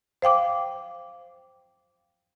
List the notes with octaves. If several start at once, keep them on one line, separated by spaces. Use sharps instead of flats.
C5 F5 G5 D6